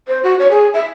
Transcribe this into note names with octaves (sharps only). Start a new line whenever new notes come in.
C5
F#4
C#5
G#4
E5